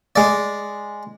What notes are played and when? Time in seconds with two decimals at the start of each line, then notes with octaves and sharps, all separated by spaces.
0.16 G#3 D5